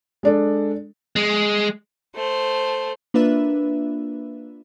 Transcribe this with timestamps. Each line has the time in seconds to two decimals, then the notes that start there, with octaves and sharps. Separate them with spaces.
0.23 G#3 D4 A4
1.16 G#3
2.15 A3 C5
3.14 A#3 D4 F4 B4 E5